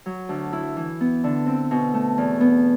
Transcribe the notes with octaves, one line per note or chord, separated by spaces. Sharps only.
F#3
D2
E4
E3
B3
D3
C4
B2
A3
E2
B3